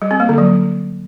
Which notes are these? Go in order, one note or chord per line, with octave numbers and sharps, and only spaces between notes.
G3
C4
A#3
D3
F#3